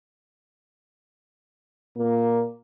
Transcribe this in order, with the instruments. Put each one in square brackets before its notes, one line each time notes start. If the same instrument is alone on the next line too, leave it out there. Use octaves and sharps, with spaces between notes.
[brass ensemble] A#2 A#3